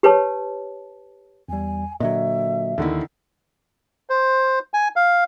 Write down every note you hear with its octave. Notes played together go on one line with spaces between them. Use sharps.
G4 B4 C#5 A5
E2 G3 G#5
A#2 D3 F#3 D#5 E5
D#2 D3 D#3 E4
C5
G#5
F5